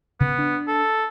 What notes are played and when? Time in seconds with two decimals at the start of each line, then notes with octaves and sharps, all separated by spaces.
0.20 C#3 B3
0.38 D4
0.68 A4